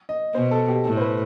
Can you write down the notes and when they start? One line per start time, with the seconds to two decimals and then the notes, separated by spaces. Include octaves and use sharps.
0.09 D#5
0.35 B2 C5
0.51 A4
0.68 G4
0.85 A2 A4
0.97 C5
1.01 B4